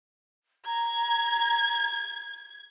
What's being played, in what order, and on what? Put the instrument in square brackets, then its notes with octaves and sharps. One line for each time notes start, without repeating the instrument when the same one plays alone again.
[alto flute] A#5 [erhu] G#6